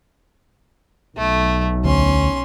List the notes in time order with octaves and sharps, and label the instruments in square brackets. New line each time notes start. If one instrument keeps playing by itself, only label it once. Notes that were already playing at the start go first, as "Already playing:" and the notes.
[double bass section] B1 [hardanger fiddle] A3
[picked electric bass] D2 [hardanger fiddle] C#4 C6